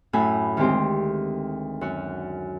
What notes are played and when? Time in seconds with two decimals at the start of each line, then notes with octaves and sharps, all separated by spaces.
0.13 F#2 A2 G#5 B5
0.57 D2 D#3 G#3 C4 G4 C5
1.81 F#2 F#4